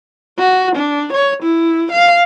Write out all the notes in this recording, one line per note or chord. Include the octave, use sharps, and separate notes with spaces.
F#4
D4
C#5
E4
F5